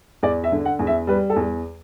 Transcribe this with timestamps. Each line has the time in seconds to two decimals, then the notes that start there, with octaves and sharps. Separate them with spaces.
0.23 E2 D5
0.44 E5
0.52 D3
0.65 F#5
0.79 E2
0.87 E5
1.07 G3 B4
1.30 A4
1.36 E2